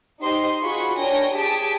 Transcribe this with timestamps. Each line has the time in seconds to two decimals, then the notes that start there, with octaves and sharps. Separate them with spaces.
0.22 D#4 G4 C5 D#5 C6
0.62 F4 F#4 G#4 C5 B5 C#6
0.99 D4 A#4 C#5 G5 G#5 A#6
1.34 G4 G#4 G#5 A5 B6 D7